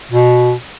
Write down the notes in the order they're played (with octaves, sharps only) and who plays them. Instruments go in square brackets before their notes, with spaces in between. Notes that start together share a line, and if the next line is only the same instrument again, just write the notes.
[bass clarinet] B2